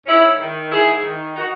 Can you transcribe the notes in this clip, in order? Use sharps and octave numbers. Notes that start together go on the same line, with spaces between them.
G#2 C#4 E4
D#3
G#2 E4 G#4
D#3
D#4 F#4